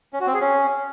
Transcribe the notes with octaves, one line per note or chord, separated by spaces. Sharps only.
C#4
F#4
C4
G#4
C#4